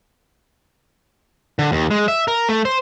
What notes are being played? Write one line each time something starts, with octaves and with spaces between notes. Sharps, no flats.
D3
D#2
G#3
E5
A#4
A3
C5